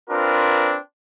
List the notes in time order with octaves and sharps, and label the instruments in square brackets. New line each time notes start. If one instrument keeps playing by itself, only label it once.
[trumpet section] C4 D4 F4 A#4 B4